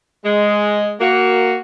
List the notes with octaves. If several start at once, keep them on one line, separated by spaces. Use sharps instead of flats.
G#3
A#3 F#4